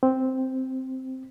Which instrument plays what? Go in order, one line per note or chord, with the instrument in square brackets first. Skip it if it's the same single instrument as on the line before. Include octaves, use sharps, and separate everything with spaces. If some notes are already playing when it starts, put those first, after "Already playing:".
[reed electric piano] C4